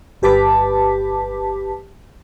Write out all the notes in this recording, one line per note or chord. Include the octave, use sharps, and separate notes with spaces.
G1 G4 B4 A5 D6 B6